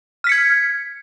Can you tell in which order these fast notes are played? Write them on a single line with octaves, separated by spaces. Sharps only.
F6 B6 C#7 G#6